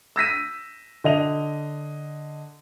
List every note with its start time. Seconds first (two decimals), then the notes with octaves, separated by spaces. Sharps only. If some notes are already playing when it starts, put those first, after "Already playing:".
0.16 E6 A#6 B6 D#7
1.04 D3 D#5 F7